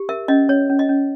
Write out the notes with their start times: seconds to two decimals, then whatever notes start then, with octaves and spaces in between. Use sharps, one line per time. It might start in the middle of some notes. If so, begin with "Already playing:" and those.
Already playing: G4
0.09 A#4 E5
0.28 C#4 D#5
0.49 C#4 C#5
0.70 C#4
0.79 D#5
0.89 C#4